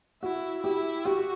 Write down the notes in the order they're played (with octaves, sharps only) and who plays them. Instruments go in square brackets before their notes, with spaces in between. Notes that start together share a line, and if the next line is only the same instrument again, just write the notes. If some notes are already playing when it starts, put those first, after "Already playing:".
[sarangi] E4 [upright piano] F#4
[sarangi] E4 [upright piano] G4
[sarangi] F#4 [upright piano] G4